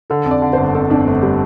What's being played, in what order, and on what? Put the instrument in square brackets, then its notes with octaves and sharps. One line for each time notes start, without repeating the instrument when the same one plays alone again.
[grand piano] D3 [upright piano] A4
[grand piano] F2
[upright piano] D5
[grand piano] D3
[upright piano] C5
[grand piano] G1
[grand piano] F2 [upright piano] A4
[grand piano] F2 [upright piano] D4
[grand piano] G1 [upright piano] A3
[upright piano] G3